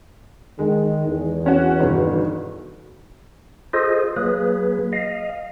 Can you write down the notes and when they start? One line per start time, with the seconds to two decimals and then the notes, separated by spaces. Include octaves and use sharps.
0.59 D#3 G#3
1.08 E2
1.46 C#4 F#4
1.80 G1 B2 D#3
3.73 F4 G#4 A4 C5 D#5
4.16 F#3 A#3 G#4 B4
4.93 D#5 F5